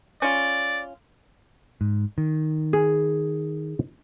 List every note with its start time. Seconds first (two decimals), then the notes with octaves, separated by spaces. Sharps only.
0.22 C#4 F4 D5
1.81 G#2
2.18 D#3
2.73 G#4